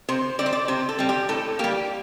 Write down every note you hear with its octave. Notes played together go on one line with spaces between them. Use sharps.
C3 C5
G3 C4 D5
C5
D5
C3 C5
A4
G3 C4
G4
A2 A4
G3 A#3 G4